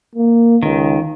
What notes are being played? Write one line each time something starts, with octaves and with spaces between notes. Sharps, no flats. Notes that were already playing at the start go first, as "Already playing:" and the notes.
A#3
C#2 D#3